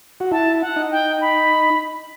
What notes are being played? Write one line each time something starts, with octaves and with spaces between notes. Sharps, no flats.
F#4
E4 A5
F#5
D#4
G5
B5